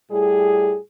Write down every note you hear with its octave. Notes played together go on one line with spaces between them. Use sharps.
A2 G3 G#4